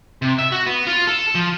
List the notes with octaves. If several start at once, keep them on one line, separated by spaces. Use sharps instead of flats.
C3
E5
F#4
B3
F4
A4
F3